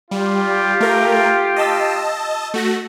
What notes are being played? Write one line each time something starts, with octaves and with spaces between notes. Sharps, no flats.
G3 F4 G4
A3 A#4
D#5 A5 E6
A3 F#4 A#6